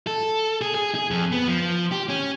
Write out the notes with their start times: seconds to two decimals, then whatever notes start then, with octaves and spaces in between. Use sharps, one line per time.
0.07 A4
0.61 G#4
0.75 G#4
0.95 G#4
1.11 F2
1.32 B3
1.47 F3
1.92 G4
2.09 C#4